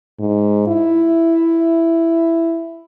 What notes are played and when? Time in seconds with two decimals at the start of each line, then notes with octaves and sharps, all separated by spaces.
0.19 G#2
0.67 E4